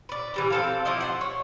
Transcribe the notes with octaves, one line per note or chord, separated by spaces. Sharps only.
B4 D5
E3 G3 A#5
C4 A4 F5
F3 E4 G4 D#5
C5 F#5
C#5